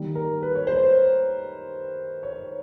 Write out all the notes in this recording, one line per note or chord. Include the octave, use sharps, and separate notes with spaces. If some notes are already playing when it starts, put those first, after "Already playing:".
Already playing: D#3 G3 A#3
A#4
B4
C#5
C5
C#5